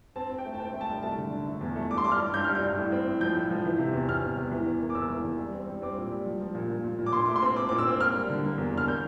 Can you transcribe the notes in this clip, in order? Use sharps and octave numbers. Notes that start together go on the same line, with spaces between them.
C4 A5
C4
G5
A3
A5
C4 G5
A3
A5
C2
A3 A5
D3
D3
A3
E2
A3
G2 D6
C6
G2 D6
F6
G2
G2 G6
G2 F6
G6
G2
A2
C4
A2
F3 G6
A2
F3
E3
C3
E2
E2 F6
E2
E2
E3
E2
A#3
D6
E2 E6
E3
E2
G3
C4
G3
C4 D6
A#2
G3
F3
F3
A#2
A#2
A#2
A#2
D6
A#2 C6
A3 D6
C6
C4
C4 D6
A#2 D6
E6
C4
A#3 F6
G3
D3
A#3
E2
D3 F6
A#3 G6